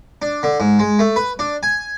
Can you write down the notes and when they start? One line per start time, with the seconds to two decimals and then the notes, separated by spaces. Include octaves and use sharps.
0.22 D4
0.43 D3
0.60 G#2
0.79 G#3
0.99 A3
1.16 B4
1.39 D4
1.63 G#5